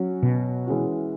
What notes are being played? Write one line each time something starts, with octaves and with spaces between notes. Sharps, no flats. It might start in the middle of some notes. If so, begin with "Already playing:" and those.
Already playing: F#3 C#4 F#4
B2
E3 G#3 C#4 F#4